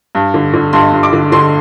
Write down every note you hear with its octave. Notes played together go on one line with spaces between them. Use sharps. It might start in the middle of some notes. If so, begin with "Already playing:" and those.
G2
D3
D3
G2 C6
G2
D6
D3
D3 C6